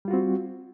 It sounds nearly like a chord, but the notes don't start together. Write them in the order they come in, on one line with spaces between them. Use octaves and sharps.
G3 F4 F#4 C4